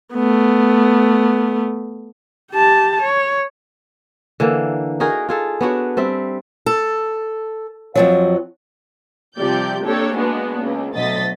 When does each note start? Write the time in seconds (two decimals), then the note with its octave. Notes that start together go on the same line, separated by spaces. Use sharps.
0.14 A3 B3
2.52 G4 A5
3.01 C#5
4.40 D3 E3 A#3
5.00 D#4 F#4 G#4 A#4
5.29 F4 G#4 A4
5.61 B3 D4 F#4 C#5
5.97 G3 C4 E5
6.66 A4
7.95 F2 F3 F#3
9.37 C3 F3 G3 G4 D5 G6
9.84 A#3 D4 G4 A4 C#5
10.16 G#3 A#3 B3 D4 F#4
10.59 C#2
10.94 D2 B2 F#3 D#5 A6 B6